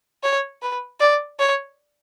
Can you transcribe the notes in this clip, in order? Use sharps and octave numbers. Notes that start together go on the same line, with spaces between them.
C#5
B4
D5
C#5